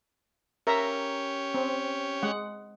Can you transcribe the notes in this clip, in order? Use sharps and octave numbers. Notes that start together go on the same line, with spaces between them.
C#4 G4 A#4 C#5 E5 A#5
C4
G#3 F#5